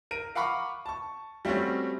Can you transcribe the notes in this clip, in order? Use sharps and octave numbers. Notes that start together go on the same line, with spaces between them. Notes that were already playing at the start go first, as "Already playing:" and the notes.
A#4 D7 D#7
F5 F#5 A#5 B5 C#6 D6
A5 C#6
G3 A3 C4 C#4 F#4